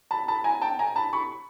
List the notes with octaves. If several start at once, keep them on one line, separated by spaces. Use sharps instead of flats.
A5 B5
A5 B5
G#5 A#5
G5 A5
G#5 A#5
A5 B5
B5 C#6